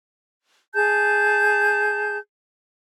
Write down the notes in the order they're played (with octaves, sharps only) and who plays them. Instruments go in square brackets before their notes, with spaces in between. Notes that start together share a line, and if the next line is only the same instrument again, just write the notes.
[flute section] G#4 A5 G6